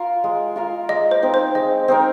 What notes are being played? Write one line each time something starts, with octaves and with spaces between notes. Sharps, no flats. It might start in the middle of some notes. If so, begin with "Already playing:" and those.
Already playing: F4 A#4 F5
G#3
F4 A#4 F5
G#3 D#5
C5
C4 D#4 A#4
C5
G#3 D#5
C4 D#4 A#4